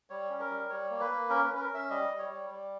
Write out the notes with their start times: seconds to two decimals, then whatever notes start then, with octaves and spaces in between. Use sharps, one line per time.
0.10 G3 C#5
0.30 C#4
0.40 A#4
0.50 G3
0.70 G3 C#5
0.90 A#3
1.00 B4
1.10 A#3
1.30 C#4 A#4
1.44 B4
1.50 C#4
1.56 B4
1.60 A#4
1.69 C#4 E5
1.90 G3 D#5
2.09 G3
2.19 C#5
2.29 G3
2.50 G3